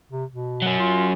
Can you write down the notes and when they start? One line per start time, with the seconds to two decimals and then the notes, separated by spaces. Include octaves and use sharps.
0.12 C3
0.32 B2
0.62 F#3 C#4
0.79 F4